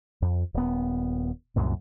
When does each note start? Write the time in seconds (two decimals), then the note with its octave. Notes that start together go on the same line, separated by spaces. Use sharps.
0.22 F2
0.54 D#1 B3
1.56 C2 F#2 A#2